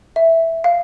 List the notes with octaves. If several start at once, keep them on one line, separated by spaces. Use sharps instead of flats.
E5
F5